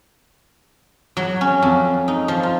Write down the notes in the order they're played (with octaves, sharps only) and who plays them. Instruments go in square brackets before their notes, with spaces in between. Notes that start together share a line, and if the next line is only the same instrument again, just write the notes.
[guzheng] F#3
C#4
F2
D#4
F3
F4